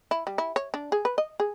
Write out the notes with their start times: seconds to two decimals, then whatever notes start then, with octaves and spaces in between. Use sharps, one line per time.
0.11 E4
0.27 G3
0.38 E4
0.56 C#5
0.74 D4
0.92 G#4
1.05 B4
1.18 D#5
1.40 G#4